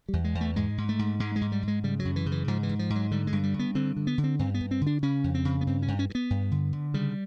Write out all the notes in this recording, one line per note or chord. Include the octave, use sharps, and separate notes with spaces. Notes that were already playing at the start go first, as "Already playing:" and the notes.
E2 G3
G#3
E2
A3
G#2 G#3
G#2
A3
G#2
G#2 G#3
G#3
G#2
G3
G#2 G#3
C#3 G3
F#3
F#2
E3
C#3
E3
G#2 F3
E3
G#2
F3
G#2
F#3
D3 G3
G#3
G2
G3
G2
B3
D3 C4
D3
B3
D3
C4
G2 C4
B3
G2
C4
D3
D4
C#3 C#4
F2
C4
C#3
B3
G2 C4
C#4
G2
C#4
G2
B3
G2
D3
D3
C#3 G3